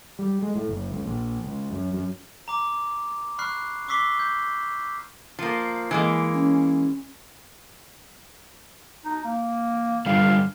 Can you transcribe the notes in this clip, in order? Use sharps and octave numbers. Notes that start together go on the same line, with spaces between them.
G3
G#3
A2
F#1
C#2
A#1
C#2
F#2
F#2
A#5 D6
B5 C#6 F6 F#6 C7
C#6 D6 E6 B6 C7 G7
G6
F3 A#3
E3 G#3 A#3
C#4
D#4
A#3
D3 G3 F4 F5